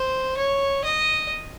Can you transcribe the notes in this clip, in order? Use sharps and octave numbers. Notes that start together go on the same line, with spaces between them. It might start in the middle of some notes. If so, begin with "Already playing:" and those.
Already playing: C5
C#5
D#5